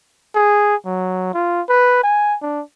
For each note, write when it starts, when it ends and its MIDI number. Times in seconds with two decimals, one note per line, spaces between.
0.35 0.75 68
0.86 1.29 54
1.34 1.62 65
1.69 1.99 71
2.03 2.36 80
2.42 2.62 62